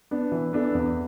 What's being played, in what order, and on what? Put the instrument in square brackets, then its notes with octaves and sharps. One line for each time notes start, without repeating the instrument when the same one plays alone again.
[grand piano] B3 D4
E3
B3 D4 A4
E2